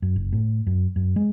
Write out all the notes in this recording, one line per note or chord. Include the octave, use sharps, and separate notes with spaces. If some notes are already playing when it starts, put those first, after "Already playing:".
F#2
F#1
A2
F#2
F#2
G#3